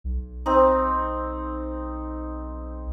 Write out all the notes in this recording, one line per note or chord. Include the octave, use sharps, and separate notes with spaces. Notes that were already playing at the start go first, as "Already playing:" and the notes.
B1
C4 D#4